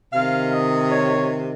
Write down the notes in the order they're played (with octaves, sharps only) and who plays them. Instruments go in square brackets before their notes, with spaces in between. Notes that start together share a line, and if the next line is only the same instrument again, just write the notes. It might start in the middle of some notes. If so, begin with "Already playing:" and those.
[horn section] C3 D#3 F5
D#5
C#5